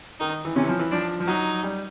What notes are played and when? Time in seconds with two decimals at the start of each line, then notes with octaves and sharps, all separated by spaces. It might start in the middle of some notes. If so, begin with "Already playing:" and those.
0.20 D#3 D#4
0.45 E3
0.56 C3 C#4
0.63 E3
0.69 F3
0.79 E3
0.91 F3 D4
1.20 F3
1.27 F#3 D#4
1.63 G3